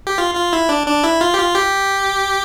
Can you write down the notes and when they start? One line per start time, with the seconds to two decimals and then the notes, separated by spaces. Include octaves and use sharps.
0.07 G4
0.18 F4
0.35 F4
0.53 E4
0.69 D4
0.87 D4
1.04 E4
1.21 F4
1.34 G4
1.39 F4
1.55 G4